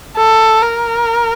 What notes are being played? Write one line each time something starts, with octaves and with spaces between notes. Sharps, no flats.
A4
A#4